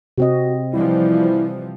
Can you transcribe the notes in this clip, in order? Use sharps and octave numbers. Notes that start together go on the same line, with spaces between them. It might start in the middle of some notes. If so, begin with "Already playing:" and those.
C3 C4 F#4 D#5
E3 F3 G3 E4